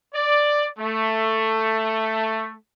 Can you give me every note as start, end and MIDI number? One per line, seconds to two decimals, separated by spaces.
0.14 0.66 74
0.79 2.55 57